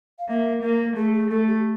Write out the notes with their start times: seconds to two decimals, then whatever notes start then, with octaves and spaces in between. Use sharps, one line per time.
0.19 F5
0.29 A#3 E5
0.62 A#3 A#4
0.96 A3 G#4
1.14 G#4
1.30 A3 A4
1.47 G4